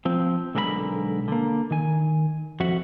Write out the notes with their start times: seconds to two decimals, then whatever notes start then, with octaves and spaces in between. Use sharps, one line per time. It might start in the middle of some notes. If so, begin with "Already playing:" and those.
0.05 F3 C4
0.55 B1 D3 G#3 A#4 E5 B5
1.28 D3 A#3
1.71 D#3 G#5
2.60 F2 F3 F#4 E5 F#5